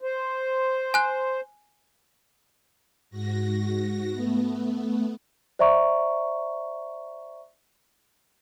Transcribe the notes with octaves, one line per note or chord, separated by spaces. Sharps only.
C5
G#5 F#6
G#2 F#4 A#6
A3 B3
C5 D5 E5 A#5 C#6